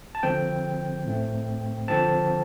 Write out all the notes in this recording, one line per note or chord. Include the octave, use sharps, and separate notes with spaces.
A5
D3 F3 C4 G5
A2 A3 C4
D3 F3 C4 A5